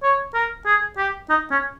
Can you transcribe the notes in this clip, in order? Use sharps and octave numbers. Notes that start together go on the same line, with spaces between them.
C#5
A#4
G#4
G4
D#4
C#4